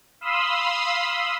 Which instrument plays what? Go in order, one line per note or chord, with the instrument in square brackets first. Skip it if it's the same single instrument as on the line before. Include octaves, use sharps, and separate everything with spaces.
[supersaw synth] F5 B5 C6 D#6 E6